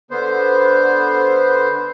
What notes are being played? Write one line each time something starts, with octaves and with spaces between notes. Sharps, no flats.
D3 B3 C5